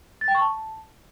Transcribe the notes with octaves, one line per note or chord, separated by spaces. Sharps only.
A6
G5
C#6
A5